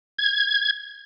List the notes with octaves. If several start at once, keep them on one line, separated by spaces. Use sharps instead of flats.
G#6